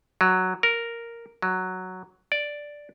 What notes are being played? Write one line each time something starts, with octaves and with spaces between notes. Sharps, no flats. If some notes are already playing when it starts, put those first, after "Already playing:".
F#3
A#4
F#3
D5